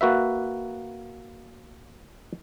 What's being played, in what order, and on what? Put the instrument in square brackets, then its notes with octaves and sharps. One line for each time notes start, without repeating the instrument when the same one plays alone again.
[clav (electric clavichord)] A#3 F#4 B4 E5